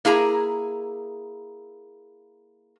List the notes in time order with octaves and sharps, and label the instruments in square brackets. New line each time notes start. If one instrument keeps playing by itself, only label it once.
[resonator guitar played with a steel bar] A#3 E4 G#4 A#5